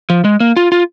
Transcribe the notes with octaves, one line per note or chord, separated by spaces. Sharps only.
F3
G#3
A#3
F4
F4